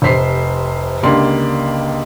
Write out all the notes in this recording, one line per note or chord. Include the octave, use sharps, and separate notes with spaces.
F1 C3 C5 B6 C7
C#2 D3 A#3 G4 D5 C6